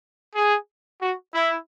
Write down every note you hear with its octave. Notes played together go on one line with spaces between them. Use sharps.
G#4
F#4
E4